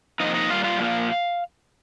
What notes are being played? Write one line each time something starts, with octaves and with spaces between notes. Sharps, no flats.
C3 F3 A#3 D#4 D#5
D#4 D#5
A#2 G3 A#3 F4 F5
F4 F5
A#2 F3 A#3